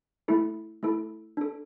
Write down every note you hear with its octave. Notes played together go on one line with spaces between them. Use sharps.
A3 E4 A4
A3 E4 A4
D4 A4